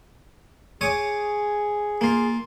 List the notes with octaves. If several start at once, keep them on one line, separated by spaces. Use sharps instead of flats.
G#4 C#5 D6 D#6
A#3 F4